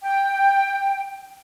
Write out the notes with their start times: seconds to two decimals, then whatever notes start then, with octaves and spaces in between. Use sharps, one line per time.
0.03 G5